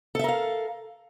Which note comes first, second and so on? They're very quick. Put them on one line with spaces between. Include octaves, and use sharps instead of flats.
A4 E5 A#4 F5